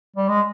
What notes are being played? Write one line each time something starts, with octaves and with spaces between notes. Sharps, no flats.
G3
G#3